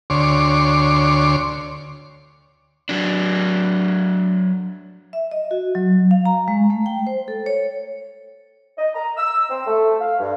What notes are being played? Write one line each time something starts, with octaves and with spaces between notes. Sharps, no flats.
D2 C#5 C6 D6
F#3 D4
E5
D#5
F#4
F#3
F5
A#5
G#3
A3
G5
C5
A4
C#5
D#5
A#5
E6
C4
A3
F5
G2